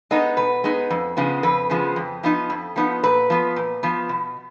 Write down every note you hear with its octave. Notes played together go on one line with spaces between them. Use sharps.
G#3 B3 D#4 D#5
B2 B4
G#3 B3 D#4
F2
C#3 F3 G#3 B3
F2 B4
C#3 F3 G#3 B3
F2
F3 B3 D#4
F2
F3 B3 D#4
A#2 B4
F3 B3
A#2
F3 B3
B2